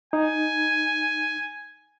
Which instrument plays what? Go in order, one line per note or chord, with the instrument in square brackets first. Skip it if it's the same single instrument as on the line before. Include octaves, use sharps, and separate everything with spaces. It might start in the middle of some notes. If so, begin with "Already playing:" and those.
[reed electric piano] D#4 [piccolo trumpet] G#5